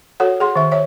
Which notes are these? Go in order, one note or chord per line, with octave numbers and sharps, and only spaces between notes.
F#4 A4 C#5 F#5
G#4 F#5 C6
D#3 E5
C#5 E5